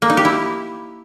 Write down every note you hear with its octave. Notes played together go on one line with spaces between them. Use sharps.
A#3
D#4
G4
E4